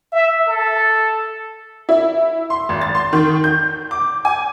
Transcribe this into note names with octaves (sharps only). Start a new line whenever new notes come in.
E5
A4
E4
C6
G#1
A6
C6
D#3
G6
D6
G#5